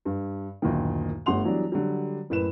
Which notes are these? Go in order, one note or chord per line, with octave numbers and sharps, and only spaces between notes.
G2
F#1 D2 A#2 D#3
G1 G3 A3 F#5 C6 F7
E3 F#3 G3 B3 D4
D3 F#3 G3
F#1 A2 B4 E7